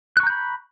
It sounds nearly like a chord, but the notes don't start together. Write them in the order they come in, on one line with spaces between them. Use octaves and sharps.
F#6 C#6 A#5 G6 B5